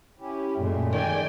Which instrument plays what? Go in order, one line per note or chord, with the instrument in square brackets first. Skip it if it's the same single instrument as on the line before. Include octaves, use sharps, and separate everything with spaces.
[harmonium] C#4 E4 G4
[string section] F#2 A#2 [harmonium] G#3 A3
[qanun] D#3 [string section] D5 G5 G#5